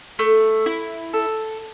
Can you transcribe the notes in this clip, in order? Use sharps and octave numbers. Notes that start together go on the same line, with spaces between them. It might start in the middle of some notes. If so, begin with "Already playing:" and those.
A3
E4
A4